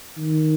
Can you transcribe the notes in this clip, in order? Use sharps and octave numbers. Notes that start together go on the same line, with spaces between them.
D#3